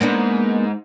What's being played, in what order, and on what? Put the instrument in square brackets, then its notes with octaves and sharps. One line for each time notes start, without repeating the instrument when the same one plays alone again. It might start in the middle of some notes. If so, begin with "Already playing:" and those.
[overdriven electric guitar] G#2 [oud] A#3 B3 D4